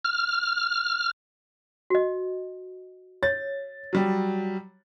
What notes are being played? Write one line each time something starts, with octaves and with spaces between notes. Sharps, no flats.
F6
F#4 D#5
C#5 A6
F#3 G3